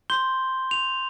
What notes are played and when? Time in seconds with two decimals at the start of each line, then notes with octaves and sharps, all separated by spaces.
0.10 C6 G6 G7
0.71 F7